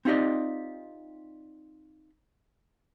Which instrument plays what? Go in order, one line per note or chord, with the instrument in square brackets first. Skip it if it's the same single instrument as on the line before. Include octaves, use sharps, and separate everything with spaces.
[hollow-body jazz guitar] C4 D#4 F4 G4 D5 D#5